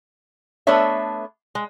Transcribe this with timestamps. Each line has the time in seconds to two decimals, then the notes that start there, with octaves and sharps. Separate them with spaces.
0.67 A3 B3 D4 A4 C#5 E5
1.55 G#3